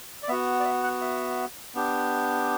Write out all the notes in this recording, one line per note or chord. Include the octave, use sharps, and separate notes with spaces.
D5
B3 F#4 E5
D5
E5
F#5
E5
B3 D4 G4